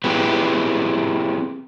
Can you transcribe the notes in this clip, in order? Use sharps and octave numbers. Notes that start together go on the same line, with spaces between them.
C4 E4 G4 G#4 B4